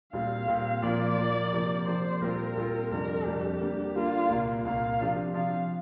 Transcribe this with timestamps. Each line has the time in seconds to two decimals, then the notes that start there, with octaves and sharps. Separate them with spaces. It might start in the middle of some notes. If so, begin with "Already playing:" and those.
0.13 A#2 G3 C4 F5
0.48 A#2 G3 C4
0.82 A#2 F3 A#3 F4 D5
1.18 A#2 F3 A#3 F4
1.53 C3 F3 A#3
1.86 C3 F3 A#3 C5
2.21 A#2 G3 C4 F4 A#4
2.57 A#2 G3 C4 F4
2.91 F2 C3 G3 D4 A#4
3.26 F2 C3 G3 D4 G4
3.61 D3 G3 A#3 D4
3.95 D3 G3 A#3 D4 F4
4.29 C2 A#2 A#3
4.64 C2 A#2 A#3 F5
4.99 C3 F3 D4 F4
5.34 C3 F3 D4 F4 F5